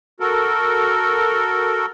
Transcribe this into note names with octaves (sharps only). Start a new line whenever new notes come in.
F#4 A4 A#4